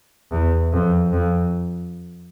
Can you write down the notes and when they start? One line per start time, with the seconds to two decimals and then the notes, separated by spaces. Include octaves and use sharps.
0.32 E2
0.72 F2
1.12 F2